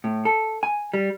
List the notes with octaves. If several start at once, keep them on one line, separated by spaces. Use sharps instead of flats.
A2
A4
G#5
G3